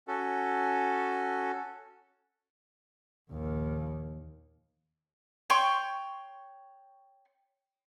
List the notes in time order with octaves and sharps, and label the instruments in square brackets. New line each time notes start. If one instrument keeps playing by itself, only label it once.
[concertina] C#4 F#4 A4
[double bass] A#1 D#2
[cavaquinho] C#5 G5 C6 C#6